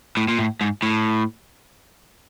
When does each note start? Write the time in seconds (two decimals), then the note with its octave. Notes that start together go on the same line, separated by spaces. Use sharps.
0.17 A2
0.28 A#2
0.39 A2
0.61 G#2
0.83 A2